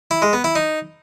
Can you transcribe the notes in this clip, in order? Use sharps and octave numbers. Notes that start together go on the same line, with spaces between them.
E4
G#3
B3
E4
D#4